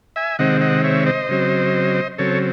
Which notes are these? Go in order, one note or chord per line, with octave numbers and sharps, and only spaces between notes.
E5 G#5
C3 D#3 G#3 C4 D#5 F#5
D#5 F#5
C#5 E5
C5 D#5
C#3 F#3 C4
C#3 F#3 C4 A4 C#5